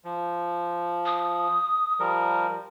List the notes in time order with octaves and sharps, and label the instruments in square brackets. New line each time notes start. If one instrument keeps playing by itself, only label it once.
[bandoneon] F3
[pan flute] D#6
[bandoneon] F3 G3 A#4